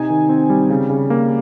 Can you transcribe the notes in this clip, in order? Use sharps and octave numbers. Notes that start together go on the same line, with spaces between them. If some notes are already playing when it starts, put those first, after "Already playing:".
Already playing: C3 D#4 G#5
D#3
C4
G3
C#3
C#3
A#3